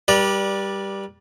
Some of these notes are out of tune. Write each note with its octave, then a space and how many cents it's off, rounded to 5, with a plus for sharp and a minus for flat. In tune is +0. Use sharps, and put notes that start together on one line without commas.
G3 +5 B4 -40 D5 +0